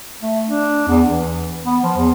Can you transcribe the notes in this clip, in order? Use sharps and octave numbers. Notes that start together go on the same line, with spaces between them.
A3
D4
E2
E3
B3
F3
E2